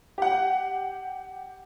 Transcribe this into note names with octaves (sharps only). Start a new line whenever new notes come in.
G4 F#5